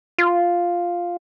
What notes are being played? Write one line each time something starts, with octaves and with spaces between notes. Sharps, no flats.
F4